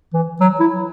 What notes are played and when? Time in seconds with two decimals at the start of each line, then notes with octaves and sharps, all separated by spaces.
0.13 E3
0.41 F#3
0.60 E4